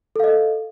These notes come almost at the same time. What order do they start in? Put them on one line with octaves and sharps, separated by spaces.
A4 F5 D#5